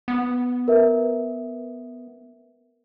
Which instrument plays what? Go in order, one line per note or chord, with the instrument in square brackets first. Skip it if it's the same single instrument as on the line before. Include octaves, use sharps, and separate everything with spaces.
[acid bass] B3
[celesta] A#4 B4 E5